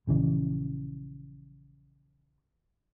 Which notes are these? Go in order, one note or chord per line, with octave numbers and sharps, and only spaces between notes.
A#1 C#3 E3